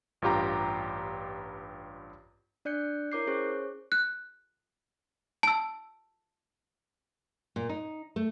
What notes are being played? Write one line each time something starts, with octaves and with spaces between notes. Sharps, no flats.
A1 G2 F4 G4 A#5
D4 D5 F#6 G6 C#7
E4 A#4 C#5 D6 G6 C7
C#4 G#4 C5 C#5 C#6 F#6
F#6
A5 E6
A#2
D#4
A3